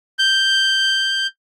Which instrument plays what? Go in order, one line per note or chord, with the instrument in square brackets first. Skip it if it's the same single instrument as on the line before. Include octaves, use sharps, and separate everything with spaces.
[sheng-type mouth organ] G6